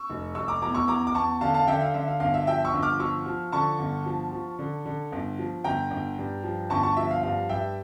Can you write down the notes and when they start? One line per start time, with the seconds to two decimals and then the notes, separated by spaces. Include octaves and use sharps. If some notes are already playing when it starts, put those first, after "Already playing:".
Already playing: C#6 E6
0.10 F1
0.35 F1 C#6 E6
0.48 A#5 D6
0.62 E2 A#5 D6
0.75 C#6 E6
0.88 E2 A#5 D6
1.07 D6
1.14 E2 A5 C#6
1.41 D3 F5 A5
1.54 F5 A5
1.67 D3 E5 G5
1.81 F5
1.94 D3 E5
2.08 F5
2.20 G1 F5
2.34 E5
2.47 F3 E5 G5
2.65 C#6 E6
2.74 G1
2.83 D6 F6
3.00 F3 C#6 E6
3.26 F3
3.52 D3 A5 C#6
3.79 G1
4.06 F3
4.32 F3
4.59 D3
4.86 D3
5.12 G1
5.39 F3
5.64 G1 G5 A#5
5.91 G1
6.18 G2
6.43 F3
6.70 G1 A5 C#6
6.83 A5 C#6
6.97 F3 E5
7.11 F5
7.23 G2 F5
7.49 G2 E5 G5